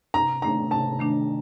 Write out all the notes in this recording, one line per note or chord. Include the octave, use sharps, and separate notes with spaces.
C3 A#5
D#3 A3 D4 A#5
C3 A5
D#3 A3 D4